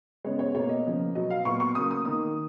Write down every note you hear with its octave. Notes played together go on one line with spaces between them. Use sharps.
C#3 G#3 B3 C#5
C#5
B2 A#3 C#5
D#5
C#3 F3 A#3
B2 F#3 B3 D#5
F5
A#2 F#3 B3 C#6
C#6
C#3 F#3 A#3 D#6
D#6
D#3 A#3 D#6